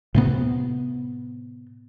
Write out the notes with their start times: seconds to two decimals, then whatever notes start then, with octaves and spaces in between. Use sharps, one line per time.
0.14 A2 C3 B3